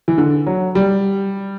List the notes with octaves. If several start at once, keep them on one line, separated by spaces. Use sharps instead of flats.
E3
D3
F#3
G3